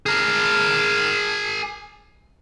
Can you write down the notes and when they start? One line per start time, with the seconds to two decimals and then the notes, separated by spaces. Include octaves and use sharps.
0.06 G#4 A#4